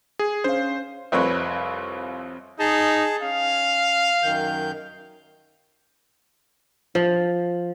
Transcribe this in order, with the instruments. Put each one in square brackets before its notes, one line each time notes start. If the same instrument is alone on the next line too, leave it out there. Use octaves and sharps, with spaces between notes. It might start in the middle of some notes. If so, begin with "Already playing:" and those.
[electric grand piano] G#4
[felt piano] C#4 F5 [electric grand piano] C5
[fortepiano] C2 F2 C4 B4 C#5 C#6
[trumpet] D#4 [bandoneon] G#4 A5
[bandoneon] C#4 [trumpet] F5
[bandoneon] F#2 D#3 G6
[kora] F3